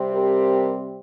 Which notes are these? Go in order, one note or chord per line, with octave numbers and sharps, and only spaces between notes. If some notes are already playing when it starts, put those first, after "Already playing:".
Already playing: C3 G3 C4
G4 A#4